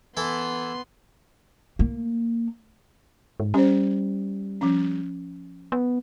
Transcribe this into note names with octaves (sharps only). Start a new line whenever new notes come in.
E3 B3 E4 A4 C6
A#3
G#2
G3 C#4 C5
F3 C#4
B3